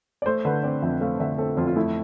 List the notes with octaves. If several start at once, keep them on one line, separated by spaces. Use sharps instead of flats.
D5
A3 C5
D3 B4
C4 D5
F2 E5
A3 F5
D3 E5
C4 A4
F2 F4
F4
A3 E4